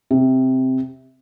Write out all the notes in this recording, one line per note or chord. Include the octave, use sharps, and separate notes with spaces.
C3